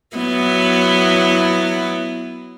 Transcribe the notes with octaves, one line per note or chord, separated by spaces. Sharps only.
F#3 B3 E4